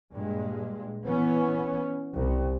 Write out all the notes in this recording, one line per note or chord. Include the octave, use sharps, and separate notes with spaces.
G2 A#2 G#3
E3 B3 C#4
C2